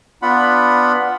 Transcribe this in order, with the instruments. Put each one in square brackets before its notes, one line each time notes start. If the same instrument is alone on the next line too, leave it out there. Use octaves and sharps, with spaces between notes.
[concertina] B3 D4 F4 F#5 B5